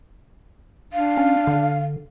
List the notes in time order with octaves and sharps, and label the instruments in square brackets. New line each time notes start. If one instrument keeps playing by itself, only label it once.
[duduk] D4 [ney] F5
[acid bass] C#4
D3